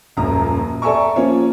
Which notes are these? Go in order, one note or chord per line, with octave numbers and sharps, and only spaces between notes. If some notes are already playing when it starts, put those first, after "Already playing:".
D#1 A#1 F#2 A#5
A4 D5 E5 G#5 A#5 C#6
F3 A#3 C#4 C#5